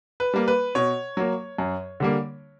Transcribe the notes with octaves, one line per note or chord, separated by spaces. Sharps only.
B4
G3 A#3
B4
B2 C#5
F#3 A#3
F#2
D3 G3 A#3